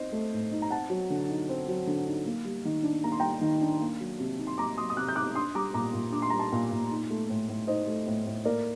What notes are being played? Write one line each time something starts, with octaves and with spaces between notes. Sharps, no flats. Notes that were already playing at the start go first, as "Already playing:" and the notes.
Already playing: C4 D#4 C5 D#5
A3
A2
D#4
A#5
C4 F#5 A5
F#3
D3
D#4
C4
F#3
D3
D#4
A#3
G3
D#3
D4
A#3 A#5
C6
G3 G5 A#5
D#3
D4
A#3
F#3
C3
D#4
C6
A#3 A#5 D6
F#3 C6 D#6
D#6
C3 D6 F#6
G6
D#4 D6 F#6
D4 C6 D#6
G3 A#5 D6
A#2 A#5 D6
A#2
D4 D6
C6
G3 A#5
A5 C6
A#2
A#2
D#4
A3
A2
A2
D#4 C5 D#5
A3
A2
A2
A#3 A#4 D5